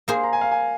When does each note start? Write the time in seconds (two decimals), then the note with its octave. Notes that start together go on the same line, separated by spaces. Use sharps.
0.08 A#3 G#4 C5 F5
0.24 A#5
0.33 G#5
0.41 F5
0.51 G#5